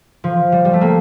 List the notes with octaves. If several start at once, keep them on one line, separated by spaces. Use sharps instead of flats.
F3
G3
G3
A3
A#3